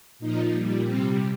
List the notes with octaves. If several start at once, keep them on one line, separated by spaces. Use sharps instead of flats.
A#2 F3 D#4
A#2 G3
C3 G3 C4